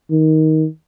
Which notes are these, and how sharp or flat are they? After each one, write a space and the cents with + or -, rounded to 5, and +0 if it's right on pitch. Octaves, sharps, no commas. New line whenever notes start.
D#3 +15